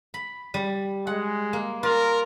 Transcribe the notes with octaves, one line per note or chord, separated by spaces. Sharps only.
B5
G3
G#3 F#5
A#3
F4 A#4